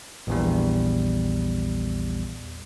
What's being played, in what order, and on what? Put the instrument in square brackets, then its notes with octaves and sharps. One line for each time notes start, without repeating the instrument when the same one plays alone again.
[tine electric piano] A#1 E2 G3